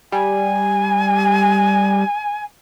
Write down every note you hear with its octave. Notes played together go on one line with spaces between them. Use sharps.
G3 G#5